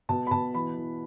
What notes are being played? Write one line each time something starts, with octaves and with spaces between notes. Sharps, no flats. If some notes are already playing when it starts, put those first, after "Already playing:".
B2 A5
B5
B2 A5
E3 B5
E3